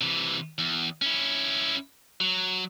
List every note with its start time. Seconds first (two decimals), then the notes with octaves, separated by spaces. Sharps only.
0.01 C3 E3
0.58 E2
1.02 C#4 E4
2.20 F#3